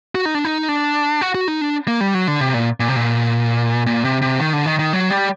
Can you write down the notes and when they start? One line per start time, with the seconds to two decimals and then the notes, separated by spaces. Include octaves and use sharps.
0.15 F#4
0.25 D#4
0.35 D4
0.45 D#4
0.69 D4
1.21 F#4
1.35 F#4
1.48 D#4
1.61 D4
1.88 A#3
2.01 G3
2.14 F#3
2.28 D3
2.41 C3
2.54 A#2
2.80 A#2
2.88 C3
2.96 A#2
3.86 A#2
4.04 C3
4.22 C3
4.40 D#3
4.53 D3
4.66 D#3
4.79 D#3
4.93 F#3
5.11 G3